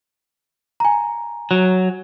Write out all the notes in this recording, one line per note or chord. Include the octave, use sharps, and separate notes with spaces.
G#5 A#5
F#3